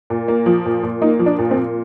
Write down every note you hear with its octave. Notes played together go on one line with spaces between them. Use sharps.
A#2
A#3
F3
A#2
A#2
A#3 D#4
F3
D4
A#2
C4
A#2